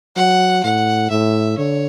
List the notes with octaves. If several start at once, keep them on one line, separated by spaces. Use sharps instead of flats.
F#3 F#5
A2 F#5
A2 E5
D3 C#5